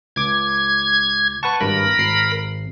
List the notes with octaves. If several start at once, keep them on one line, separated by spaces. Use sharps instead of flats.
C#2 D6 G#6
B4 F#5 A5 C#6
G#1 G2 A#4 B5
G#1 C7